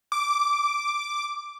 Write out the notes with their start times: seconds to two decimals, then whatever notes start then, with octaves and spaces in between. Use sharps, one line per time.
0.12 D6